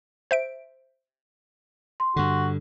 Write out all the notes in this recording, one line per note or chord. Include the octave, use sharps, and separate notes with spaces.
C5 E5 D7
C6
G2 D3 F#4